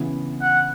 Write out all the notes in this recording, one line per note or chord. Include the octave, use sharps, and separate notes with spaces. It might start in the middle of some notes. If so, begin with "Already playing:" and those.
Already playing: C#3 E3 B3
F#5